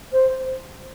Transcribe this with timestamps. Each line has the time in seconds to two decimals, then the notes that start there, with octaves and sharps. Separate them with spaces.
0.12 C5